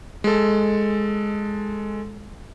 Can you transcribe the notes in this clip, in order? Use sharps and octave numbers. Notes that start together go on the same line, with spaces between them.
G#3 A4